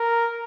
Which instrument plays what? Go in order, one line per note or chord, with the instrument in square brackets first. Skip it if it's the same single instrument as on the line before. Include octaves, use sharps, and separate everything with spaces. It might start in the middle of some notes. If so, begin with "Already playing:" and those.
Already playing: [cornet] A#4